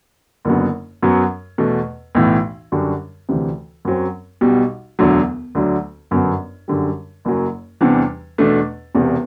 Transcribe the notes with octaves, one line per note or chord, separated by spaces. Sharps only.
F#1 F#2 D3 F#3 B3
F#2 F#3 B3
E2 B2 A3
B1 A2 E3
F#2 D3 G3 D4 F#4
D2 C3 E3
F#2 F#3 C4
B1 B2 G3
E1 D2 D3 F#3
D2 D3 F#3
G1 F#2 F#3 B3
F#2 D3 G3
F#1 F#2 F#3
E2 C3 E3 G3 D4
E2 B2 A3 D4
E1 E2 C3